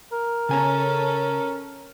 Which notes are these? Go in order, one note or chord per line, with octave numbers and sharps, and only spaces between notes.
A#4
C#3 C#4 A4 G#5 A#5